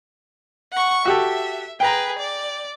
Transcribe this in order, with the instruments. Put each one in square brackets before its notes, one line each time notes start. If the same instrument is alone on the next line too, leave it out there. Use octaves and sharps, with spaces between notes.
[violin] F#5 C#6
[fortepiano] F#4 G4 A4 [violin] E5
[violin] G#4 B4 [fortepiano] G5 A#5
[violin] D5